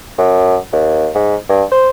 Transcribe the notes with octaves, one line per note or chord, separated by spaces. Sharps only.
F#2
D#2
G#2
G2
C5